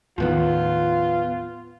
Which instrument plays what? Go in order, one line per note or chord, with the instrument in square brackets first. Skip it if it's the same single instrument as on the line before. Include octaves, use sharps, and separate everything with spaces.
[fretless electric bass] D#2 A2 D#3 [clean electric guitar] F3 B3 [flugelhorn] F4